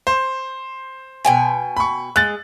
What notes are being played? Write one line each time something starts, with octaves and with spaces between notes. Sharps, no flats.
C5
B2 G5 G#5
B5 C#6
G#3 F#6 A6